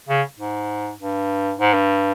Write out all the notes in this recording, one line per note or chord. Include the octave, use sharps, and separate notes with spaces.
C#3
G#2
G2
G#2
G2